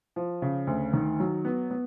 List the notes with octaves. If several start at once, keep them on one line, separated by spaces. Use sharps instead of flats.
F3
C#3
D2
D#3
F#3
B3
B3